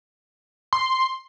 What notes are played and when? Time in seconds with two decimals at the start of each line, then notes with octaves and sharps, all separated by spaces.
0.73 C6